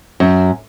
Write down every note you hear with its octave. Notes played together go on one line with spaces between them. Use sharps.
F#2